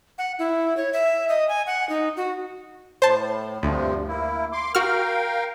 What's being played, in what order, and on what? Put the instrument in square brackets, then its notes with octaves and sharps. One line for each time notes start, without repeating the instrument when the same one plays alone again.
[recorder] F#5
E4
C#5
E5
D#5
G#5
F#5
D#4
F#4
[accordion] A2 [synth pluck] C5 A5
[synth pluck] D2 [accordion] G2 C3 F3
[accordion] A#3 E4
C6 D6
[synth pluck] F#4 F6 [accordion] A#4 F5 G5